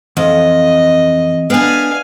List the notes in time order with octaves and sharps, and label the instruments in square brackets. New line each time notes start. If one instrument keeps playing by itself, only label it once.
[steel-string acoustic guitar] F2 [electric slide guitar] E3 C4 F5 [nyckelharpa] D#5
[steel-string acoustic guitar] B3 D4 [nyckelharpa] F5 G#5